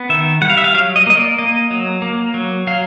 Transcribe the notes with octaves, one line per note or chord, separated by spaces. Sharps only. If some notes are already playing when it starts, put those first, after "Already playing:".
Already playing: B3
D#3 E5
G3 F#5
F5
E5
F5
F#3 F5
D#5
A#3 D#5
D5
A#3 D#5
F#3
A#3
F#3
F#3 F5